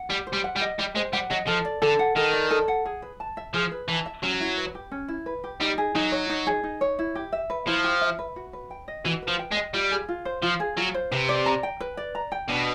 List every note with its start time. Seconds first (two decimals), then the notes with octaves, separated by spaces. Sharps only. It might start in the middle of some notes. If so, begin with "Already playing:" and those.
Already playing: F#5
0.10 G3 G4
0.27 C5
0.33 G3
0.44 F#5
0.56 G3
0.61 D#5
0.79 G3 G4
0.95 G#3 C5
1.13 G3 F#5
1.30 F#3 D#5
1.47 F3 A4
1.65 D5
1.82 D3 A4
1.99 F#5
2.16 D#3 A4
2.33 D5
2.51 A4
2.68 F#5
2.85 G#4
3.02 B4
3.20 A5
3.37 E5
3.54 F3 G#4
3.71 B4
3.88 E3 A5
4.06 E5
4.23 F#3 C#4
4.40 E4
4.58 B4
4.75 G4
4.92 C#4
5.08 E4
5.26 B4
5.44 G4
5.61 G3 D#4
5.78 G#4
5.95 F#3 D#4
6.12 C#5
6.30 D#4
6.47 G#4
6.63 D#4
6.81 C#5
6.99 E4
7.15 G4
7.33 E5
7.50 B4
7.67 F3 E4
7.84 G4
8.01 E5
8.19 B4
8.36 F#4
8.53 B4
8.71 G5
8.88 D#5
9.05 E3 F#4
9.22 B4
9.28 F3
9.39 G5
9.51 G#3
9.56 D#5
9.74 G3 F4
9.91 G#4
10.09 F4
10.25 C5
10.42 F3 F4
10.60 G#4
10.77 F#3 F4
10.94 C5
11.12 C3 B4
11.29 D5
11.46 A#5
11.63 G5
11.80 B4
11.97 D5
12.15 A#5
12.32 G5
12.49 B2 D4